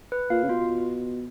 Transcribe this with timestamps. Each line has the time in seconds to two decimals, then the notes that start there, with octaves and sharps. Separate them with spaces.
0.12 B4
0.30 A#2 F5
0.43 C#3
0.49 B2 F4